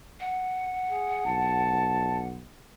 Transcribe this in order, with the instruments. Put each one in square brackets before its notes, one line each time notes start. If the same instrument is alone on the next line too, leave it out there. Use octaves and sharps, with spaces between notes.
[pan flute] F#5
[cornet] G#4
[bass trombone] B1 [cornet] A5